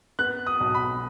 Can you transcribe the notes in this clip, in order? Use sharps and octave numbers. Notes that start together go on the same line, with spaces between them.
B3 F#6
D#6
B1
B5